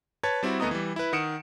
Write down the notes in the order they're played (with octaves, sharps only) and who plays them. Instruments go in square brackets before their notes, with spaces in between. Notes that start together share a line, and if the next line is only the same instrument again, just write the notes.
[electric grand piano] B4 C#5 A5 G#6 A6
G3 C4 E4 F#4
D2 A3 B3 D#5 A#5 D#6
E3 G3
E4 B4
D#3 F#5 D#6 C#7 D7 E7